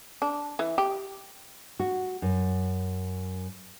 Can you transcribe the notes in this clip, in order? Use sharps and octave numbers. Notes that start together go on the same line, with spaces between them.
D4
E3
G4
F#4
F#2